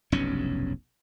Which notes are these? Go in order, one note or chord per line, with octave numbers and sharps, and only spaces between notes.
F1 B1 G2 C#4